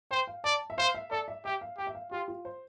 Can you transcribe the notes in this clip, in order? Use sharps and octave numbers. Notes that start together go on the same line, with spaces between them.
C5 G5
F5
D5 A5
E5
C5 F5
E5
A4 D5
E5
G4 E5
F5
G4 G5
E5
F5
F4 G4
F4
C5